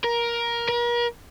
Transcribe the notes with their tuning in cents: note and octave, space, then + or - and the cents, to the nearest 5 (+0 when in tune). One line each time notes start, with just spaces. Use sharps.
A#4 +15
A#4 +40